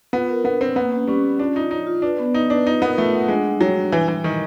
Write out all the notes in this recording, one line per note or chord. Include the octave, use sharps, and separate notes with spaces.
B3 F4
A#4
B3 D4
C4 C#5
A#3 B3
C#4
G3 C#4
C#4
D4 F4
D#4 F4
D#4 C#5
F4
D4 B4
B3
B3 D#4
D4 B4
D#4 F4
B3 A#4
A3 F4
F#5
G#3 D4
G3
F#3 G3
D4
E3 G3
E3 G3
D#3 G3